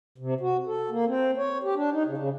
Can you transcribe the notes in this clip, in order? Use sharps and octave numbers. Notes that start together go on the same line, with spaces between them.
C3
F#4
A4
A#3
C4
C#5
G4
D4
D#4
C#3
C#3